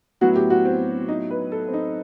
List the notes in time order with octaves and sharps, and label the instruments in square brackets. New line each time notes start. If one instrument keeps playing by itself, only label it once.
[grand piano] A2 F#3 B3 E4 [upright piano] F#4
[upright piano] G4
F#4
C4
D#4
B4
A4
C4
D#4